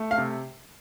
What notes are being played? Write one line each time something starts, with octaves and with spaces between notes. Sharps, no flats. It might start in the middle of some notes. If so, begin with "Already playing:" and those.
Already playing: A3
F5
C3